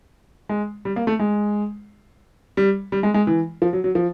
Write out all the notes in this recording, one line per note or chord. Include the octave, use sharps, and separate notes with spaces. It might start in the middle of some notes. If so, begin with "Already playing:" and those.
G#3
G3
A#3
A3
G#3
G3
G3
G#3
G#3
E3
F3
F#3
F#3
F3